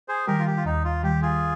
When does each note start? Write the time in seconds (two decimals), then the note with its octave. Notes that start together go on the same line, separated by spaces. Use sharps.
0.08 G#4 C5
0.27 D#3 G3 G4 A#4
0.39 F4
0.46 G4
0.57 F4
0.65 D#2 D#4
0.85 F4
1.03 D#3 G3 G4
1.22 F4 G#4